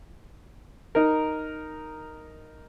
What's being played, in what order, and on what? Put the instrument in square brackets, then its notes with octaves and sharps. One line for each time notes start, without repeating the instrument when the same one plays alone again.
[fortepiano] D#4 A#4